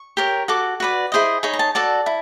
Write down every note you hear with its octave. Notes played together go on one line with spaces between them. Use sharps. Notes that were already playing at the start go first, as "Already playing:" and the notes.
Already playing: C#6
G4 A#4 C#5
F#4 A4 D6
F#4 B4 D5
E4 G#4 C5 D#5
D#4 G#4 C#5 B5
A#5
A5
F#4 A4 D5 A5
E4